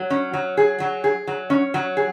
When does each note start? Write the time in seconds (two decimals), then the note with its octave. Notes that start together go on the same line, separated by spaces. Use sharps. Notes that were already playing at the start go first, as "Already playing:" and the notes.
Already playing: F#3
0.10 C#4
0.33 F#3
0.57 G#4
0.80 F#3
1.04 G#4
1.27 F#3
1.50 C#4
1.74 F#3
1.97 G#4